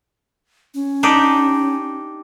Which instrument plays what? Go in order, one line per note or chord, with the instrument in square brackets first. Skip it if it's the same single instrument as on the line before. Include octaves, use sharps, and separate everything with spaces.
[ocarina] C#4
[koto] D4 D#4 G4